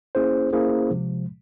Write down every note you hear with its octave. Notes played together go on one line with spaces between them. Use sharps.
A#3 C#4 E4 G#4 C5
A#3 C#4 E4 G#4 C5
C3 F3 G#3